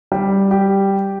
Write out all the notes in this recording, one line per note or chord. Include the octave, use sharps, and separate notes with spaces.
G3
G4